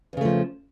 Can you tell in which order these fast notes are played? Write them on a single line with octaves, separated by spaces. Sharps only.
E2 C#3 A3 F3